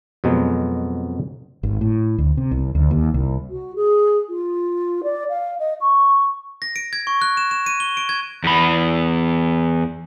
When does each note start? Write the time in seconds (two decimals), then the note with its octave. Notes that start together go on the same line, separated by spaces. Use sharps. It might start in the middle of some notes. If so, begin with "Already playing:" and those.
0.24 F2 B2 F#3 G#3 B3
1.63 G#1
1.81 A2
2.18 D2
2.37 C3
2.51 C2
2.75 D2
2.91 D#2
3.14 C2
3.49 F#4
3.75 G#4
4.29 F4
5.03 D5
5.29 F5
5.59 D#5
5.80 C#6
6.62 A#6
6.76 D7
6.93 G#6
7.07 C#6
7.22 F#6
7.37 E7
7.51 E7
7.66 D#7
7.80 G7
7.97 D7
8.09 G#6
8.44 E2 B5